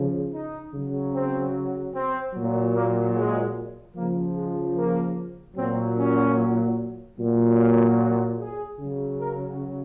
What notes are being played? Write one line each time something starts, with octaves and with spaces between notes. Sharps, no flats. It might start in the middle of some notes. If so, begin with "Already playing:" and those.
Already playing: C#3 F3
D#4
C#3 F#3
C4
C4
A#2 F#3
A#3
G#3
C#3 F3 A#3
G#3
A#3
A#2 F#3 C4
C#4
A#2 F#3
F4
F#4
G#4
C#3 F#3
A#4